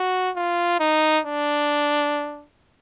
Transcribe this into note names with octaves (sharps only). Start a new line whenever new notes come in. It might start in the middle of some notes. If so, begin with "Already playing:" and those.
Already playing: F#4
F4
D#4
D4